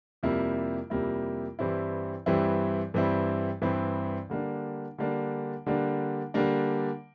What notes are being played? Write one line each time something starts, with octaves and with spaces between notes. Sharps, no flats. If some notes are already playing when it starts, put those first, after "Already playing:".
F2 C3 G3 A#3 E4
F2 C3 G3 A#3 E4
G2 E3 G3 C4 E4
G2 E3 G3 C4 E4
G2 E3 G3 C4 E4
G2 E3 G3 C4 E4
D3 G3 A#3 D4
D3 G3 A#3 D4
D3 G3 A#3 D4
D3 G3 A#3 D4